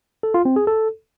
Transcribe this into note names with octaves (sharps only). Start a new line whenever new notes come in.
A4
F4
C4
G#4
A4